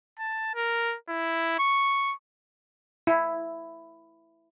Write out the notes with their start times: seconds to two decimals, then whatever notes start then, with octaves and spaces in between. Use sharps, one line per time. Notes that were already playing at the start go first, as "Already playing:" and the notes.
0.19 A5
0.55 A#4
1.09 E4
1.59 C#6
3.07 E4